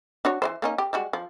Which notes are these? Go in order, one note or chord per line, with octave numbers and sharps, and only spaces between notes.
D4 F#4 C#5
E3 G#3 C5
A#3 C#4 D#4
G4
G3 G#3 F#4
F3